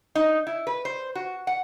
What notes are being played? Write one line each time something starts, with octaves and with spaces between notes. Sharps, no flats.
D#4
E4
B4
C5
F#4
F#5